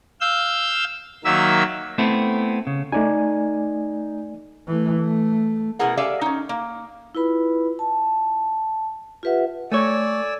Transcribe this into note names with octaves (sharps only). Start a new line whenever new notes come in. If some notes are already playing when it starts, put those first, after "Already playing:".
F5 E6 G6
D#3 F#3 A#3 E5 E6
A3 B3 C4 E4
C#3
A3 D#4 D5 G#5
E3 A3
A3
B2 B3 E4 G#4 A#4 F#5
G4 A4 D5 E5 F5 G#5
C#4 D#4
A#3
E4 F4 B4 B5
A5
F4 G4 B4 E5 F#5
A3 C#5 D5 G#5 E6